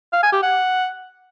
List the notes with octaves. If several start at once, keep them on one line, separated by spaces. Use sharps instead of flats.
F5
G#5
G4
F#5